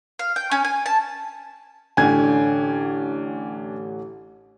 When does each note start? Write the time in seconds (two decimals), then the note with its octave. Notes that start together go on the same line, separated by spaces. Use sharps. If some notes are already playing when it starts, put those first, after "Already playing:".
0.19 F5
0.36 G5
0.51 C#4
0.65 G#5
0.86 A5
1.97 A1 D3 C#4 D4 G5 G#5 G#6